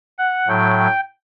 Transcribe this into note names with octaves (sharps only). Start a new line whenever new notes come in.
F#5
A2 F#3 G5